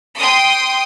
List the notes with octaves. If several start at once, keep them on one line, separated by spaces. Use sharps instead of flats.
G5 C6 D#6